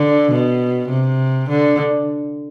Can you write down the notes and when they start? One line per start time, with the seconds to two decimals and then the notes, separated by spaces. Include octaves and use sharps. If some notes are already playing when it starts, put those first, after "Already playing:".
Already playing: D3
0.31 B2
0.89 C3
1.49 D3